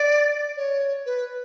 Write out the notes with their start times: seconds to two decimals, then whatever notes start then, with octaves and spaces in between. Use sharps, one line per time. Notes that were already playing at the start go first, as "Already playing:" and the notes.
Already playing: D5
0.57 C#5
1.06 B4